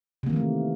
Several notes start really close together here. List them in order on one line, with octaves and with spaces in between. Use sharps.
C3 A#3 D#3 E3 A3